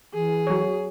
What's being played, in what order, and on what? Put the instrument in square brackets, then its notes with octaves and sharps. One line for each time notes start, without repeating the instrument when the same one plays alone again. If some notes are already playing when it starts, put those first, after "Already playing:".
[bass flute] E3 [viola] G#4
[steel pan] F#3 C#5